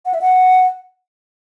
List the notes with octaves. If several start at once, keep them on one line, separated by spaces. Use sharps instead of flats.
F#5
E5
F#5